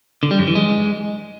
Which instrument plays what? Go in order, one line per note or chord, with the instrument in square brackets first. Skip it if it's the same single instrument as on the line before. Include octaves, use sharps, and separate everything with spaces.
[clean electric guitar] D3
G3
F#2
E3
G#3